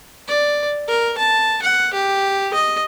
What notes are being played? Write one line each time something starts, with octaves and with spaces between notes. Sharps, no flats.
D5
A#4
A5
F#5
G4
D#5